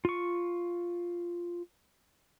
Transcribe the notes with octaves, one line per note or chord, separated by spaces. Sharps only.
F4 C#6